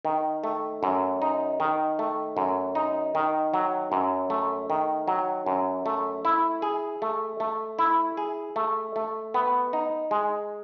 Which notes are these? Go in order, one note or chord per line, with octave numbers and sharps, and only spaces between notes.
D#3
A3
F#2
D#4
D#3
A3
F#2
D#4
D#3
F#3
F#2
A3
D#3
F#3
F#2
A3
E4
G#4
A3
A3
E4
G#4
A3
A3
B3
D#4
G#3